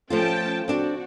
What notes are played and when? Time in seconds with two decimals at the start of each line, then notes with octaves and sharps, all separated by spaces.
0.10 F3 A3 C#4 F4 G5 A5
0.68 C4 D4 F#4